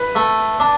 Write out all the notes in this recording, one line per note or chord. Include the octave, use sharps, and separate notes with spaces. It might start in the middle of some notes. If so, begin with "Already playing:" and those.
Already playing: B4
A3
D4